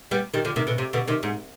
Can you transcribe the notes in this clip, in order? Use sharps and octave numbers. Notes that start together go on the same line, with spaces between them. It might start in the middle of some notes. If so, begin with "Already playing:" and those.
G3 B3
D#3 G3
D3 F3
C3 D#3
B2 D3
C3
B2 D3
C3 D#3
G#2